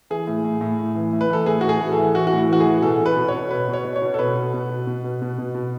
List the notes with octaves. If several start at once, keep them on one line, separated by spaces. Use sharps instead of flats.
E3 G#4
A2
A2
A2
A2
E3
A2
B4
E3 A4
A2 G#4
F#4
A2 G#4
E3
A4
E3
E3 F#4
F#4
A2 E4
E3 F#4
G#4
E3
B2 A4
B2
B4
B2
C#5
B2
B2 B4
B2
C#5
B2
C#5
B2
A4
B2 B4
B2
B2
B2
B2
B2
B2
B2
B2